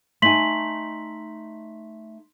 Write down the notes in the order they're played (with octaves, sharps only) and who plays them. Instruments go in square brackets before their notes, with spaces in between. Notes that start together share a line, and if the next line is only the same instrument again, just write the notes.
[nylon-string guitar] A3 D#4 G#5 [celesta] C6 B6 F#7